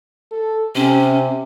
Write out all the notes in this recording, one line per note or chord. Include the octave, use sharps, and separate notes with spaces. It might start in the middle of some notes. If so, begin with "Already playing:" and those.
A4
C3 C#4